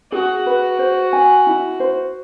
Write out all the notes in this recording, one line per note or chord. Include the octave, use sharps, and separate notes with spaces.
F#4 G#4
B4
C5
G#5
E4
C5